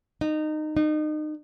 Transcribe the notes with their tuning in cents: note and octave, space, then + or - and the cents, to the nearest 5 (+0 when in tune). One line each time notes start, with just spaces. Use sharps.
D#4 -20
D#4 -30